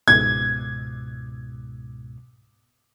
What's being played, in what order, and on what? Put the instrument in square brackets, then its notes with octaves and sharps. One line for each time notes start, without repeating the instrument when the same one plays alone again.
[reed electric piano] C#2 G#2 B2 [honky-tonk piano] G#6